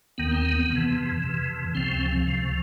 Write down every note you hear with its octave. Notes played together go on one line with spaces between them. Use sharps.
D#2 D#3 B3
C4
B3
F2 C3 E3
F2 C3 E3
C#2 C3 F3 C4
C#2 C3 F3